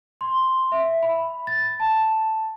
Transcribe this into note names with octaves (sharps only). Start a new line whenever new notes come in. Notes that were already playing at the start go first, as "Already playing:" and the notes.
C6
E5
B5
A6
A5